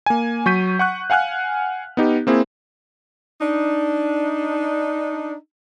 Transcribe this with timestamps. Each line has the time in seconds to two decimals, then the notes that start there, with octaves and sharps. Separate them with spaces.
0.06 A#3 G#5
0.46 F#3 C#6 G6 B6 D#7
0.79 F#5 C#6 F#6
1.10 F5 F#5 G#5 F6 F#6
1.97 B3 D#4 G4
2.27 A#3 C4 E4 G#4
3.41 D4 D#4